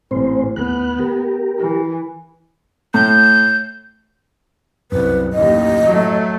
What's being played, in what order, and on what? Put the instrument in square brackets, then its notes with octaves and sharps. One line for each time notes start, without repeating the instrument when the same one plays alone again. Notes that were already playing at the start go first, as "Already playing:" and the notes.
[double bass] A1 [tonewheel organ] A2 C4 C5
[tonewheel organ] D#2 F#6 [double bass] B3
[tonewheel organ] G4 A#4
[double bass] E3
[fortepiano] A2 [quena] G6
[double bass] C2 [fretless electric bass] F#2 [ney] B4
[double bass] A1 D#2 [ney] D#5
[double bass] F#3 A3